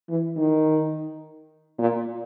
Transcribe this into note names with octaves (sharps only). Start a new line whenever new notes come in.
E3
D#3
A#2